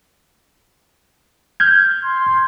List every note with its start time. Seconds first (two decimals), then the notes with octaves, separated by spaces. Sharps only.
1.60 F6 G6 G#6
2.04 C6